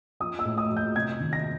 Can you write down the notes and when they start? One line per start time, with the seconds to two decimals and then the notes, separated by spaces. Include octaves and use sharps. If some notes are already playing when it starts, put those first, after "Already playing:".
0.20 F3 D#6
0.39 E6
0.45 A2
0.58 D#6
0.71 F3
0.77 G6
0.95 C3 G#6
1.20 D#3
1.33 A#6